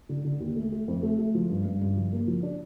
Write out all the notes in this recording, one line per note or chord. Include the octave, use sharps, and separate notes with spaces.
D3
D3
D#2
A3
A3
F2
A3
A3
F3
G2
G2
G2
F3
A#3
F3
D4